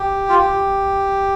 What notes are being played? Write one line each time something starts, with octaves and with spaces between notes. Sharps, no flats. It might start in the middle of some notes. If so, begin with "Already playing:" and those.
Already playing: G4
F4
G4